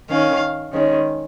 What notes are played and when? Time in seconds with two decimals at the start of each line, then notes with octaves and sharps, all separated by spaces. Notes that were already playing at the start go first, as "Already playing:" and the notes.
0.09 D#3 C#4 F5
0.72 D#3 G#3 C#4